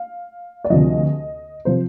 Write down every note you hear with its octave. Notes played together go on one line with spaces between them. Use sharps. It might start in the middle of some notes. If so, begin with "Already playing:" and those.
Already playing: F5
D5
D2 C3 F3 D#5
C3 F3 C5